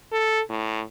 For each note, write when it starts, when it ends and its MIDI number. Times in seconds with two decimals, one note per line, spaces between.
0.12 0.41 69
0.50 0.81 45